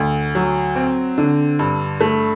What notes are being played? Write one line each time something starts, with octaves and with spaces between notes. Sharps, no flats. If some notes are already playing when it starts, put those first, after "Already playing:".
Already playing: D2
F#3
C4
D3
G2
A3